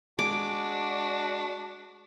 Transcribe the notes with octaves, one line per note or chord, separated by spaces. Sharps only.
G#3 D4 F#4 D6